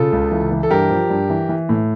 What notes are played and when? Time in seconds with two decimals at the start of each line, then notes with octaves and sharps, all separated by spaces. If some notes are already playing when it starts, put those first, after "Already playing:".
Already playing: C#3 F4 A4
0.13 C#2
0.32 E3
0.51 E3
0.63 A4
0.71 G2 G4 A#4
0.90 F3
1.10 G2
1.30 E3
1.49 E3
1.69 A2